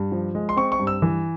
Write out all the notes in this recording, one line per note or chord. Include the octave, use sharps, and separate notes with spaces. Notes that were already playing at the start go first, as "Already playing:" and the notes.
Already playing: G2
F3
G#3
C6
C4 C#6
C#6
G2
E6
E3